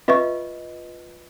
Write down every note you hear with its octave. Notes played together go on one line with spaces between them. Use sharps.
F4 B4 D#5 E5 C#6